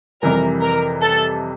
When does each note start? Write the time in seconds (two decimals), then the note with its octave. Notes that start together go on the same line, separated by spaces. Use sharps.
0.22 F2 C3 E3 G3 A#4
0.62 A#4
1.02 A4